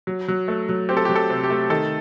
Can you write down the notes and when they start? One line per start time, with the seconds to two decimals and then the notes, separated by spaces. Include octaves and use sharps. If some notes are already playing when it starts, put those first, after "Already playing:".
0.07 F#3
0.28 F#3
0.48 A3
0.69 F#3
0.89 C4 G4
0.97 A4
1.05 G4
1.09 F#3
1.16 A4
1.30 C3
1.44 G4
1.50 A3
1.70 D#3 A4